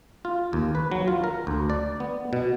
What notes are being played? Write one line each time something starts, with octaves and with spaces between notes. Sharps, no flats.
F4
D#2
B4
F#3
F4
A#4
D2
D5
B3
B2